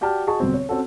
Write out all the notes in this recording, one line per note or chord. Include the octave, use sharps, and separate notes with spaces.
F#4 G4 D5 G5 A5 F6
F#4 G#4 D#5 A5 C#6
G1 B2 C4
C#5
C4 C#4 F#4 A4